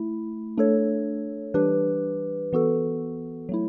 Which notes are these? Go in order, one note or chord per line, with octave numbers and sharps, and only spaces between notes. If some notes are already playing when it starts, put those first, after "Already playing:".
Already playing: A3 E4
A3 D4 A4 C#5
E3 G3 D4 G4 B4
E3 B3 F#4 A4
F#3 A3 E4